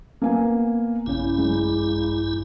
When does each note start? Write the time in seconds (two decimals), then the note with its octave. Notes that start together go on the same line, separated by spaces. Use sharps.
0.22 A#3 B3 G#5
1.06 A#1 G2 C#3 C#4 E4
1.38 G#3